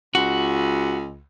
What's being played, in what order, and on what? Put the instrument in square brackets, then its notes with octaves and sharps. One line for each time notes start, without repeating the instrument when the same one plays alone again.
[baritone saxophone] C#2 [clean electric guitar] F#4